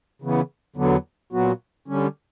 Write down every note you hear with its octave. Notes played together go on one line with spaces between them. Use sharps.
C#3 E3 B3
E2 D3 F#3 B3
A#2 F#3 B3 F#4
D3 G3 C#4